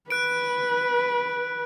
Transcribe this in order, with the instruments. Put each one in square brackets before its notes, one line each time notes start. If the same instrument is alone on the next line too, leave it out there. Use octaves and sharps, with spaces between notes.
[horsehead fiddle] B4 [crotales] F#6 D7